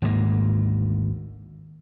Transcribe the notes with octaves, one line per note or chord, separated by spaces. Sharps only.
G#1 D2 G#2 A#3